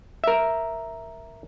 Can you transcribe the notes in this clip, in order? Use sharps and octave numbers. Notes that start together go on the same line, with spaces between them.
A#4 E5